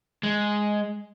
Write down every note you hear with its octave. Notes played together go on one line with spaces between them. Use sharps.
G#3